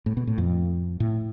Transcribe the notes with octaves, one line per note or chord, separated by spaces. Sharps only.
A2
B2
A2
F2
A2